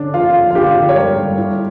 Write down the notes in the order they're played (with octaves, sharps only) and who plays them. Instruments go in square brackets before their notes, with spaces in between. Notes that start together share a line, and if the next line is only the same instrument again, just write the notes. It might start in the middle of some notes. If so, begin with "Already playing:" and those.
Already playing: [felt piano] D3 C#4 [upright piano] D4
[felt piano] F3 [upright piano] F4
[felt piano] F3
[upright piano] F4
[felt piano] D3 [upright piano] G4
[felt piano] D3
[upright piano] C#5
[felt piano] G2 [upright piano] A#4
[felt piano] G2
E4